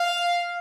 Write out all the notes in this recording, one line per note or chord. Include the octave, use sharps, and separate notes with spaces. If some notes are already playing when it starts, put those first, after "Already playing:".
Already playing: F5